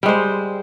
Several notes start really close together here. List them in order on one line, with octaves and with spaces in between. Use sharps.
G3 G#3 C5